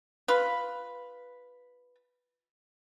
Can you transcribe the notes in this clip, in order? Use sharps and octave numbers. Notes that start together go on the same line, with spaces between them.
F4 B4